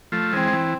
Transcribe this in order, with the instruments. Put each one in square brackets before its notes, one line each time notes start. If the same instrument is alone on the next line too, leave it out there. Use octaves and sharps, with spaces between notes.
[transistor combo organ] F3 A3
[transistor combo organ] E3 G#3 [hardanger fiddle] C4
[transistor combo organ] E3